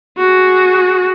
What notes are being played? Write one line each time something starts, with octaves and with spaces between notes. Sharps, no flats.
F#4 G#4